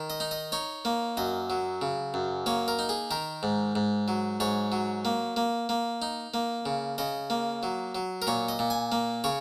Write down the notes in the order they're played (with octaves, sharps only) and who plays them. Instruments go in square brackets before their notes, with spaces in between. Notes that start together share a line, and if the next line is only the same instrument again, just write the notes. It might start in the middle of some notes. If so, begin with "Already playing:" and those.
Already playing: [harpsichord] D#3
D#5
D#4
D#5
D#4 C#5
A#3
F#2 D#5
F#3
C#3
F#2
A#3 C#5
A#4
D#4
G#4
D#3 A#4
G#2
G#2
F#3
G#2 C#5
F#3
A#3
A#3
A#3
D#4
A#3
C#3
C#3 D#5
A#3
F#3
F#3
A#4
A#2 C#5
D#5
A#2
G#5
A#3
C#3 C#5